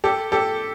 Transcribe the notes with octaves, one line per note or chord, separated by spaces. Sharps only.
G4 A4
G4 A4